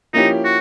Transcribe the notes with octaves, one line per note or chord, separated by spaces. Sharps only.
F3 A#3 C#4 D#4 E4 G4
F#4